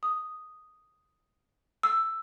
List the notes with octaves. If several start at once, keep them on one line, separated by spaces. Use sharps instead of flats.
D#6
E6